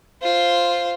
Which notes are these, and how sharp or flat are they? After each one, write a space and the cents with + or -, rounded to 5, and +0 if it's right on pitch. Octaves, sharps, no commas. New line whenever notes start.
F4 -5 C5 +0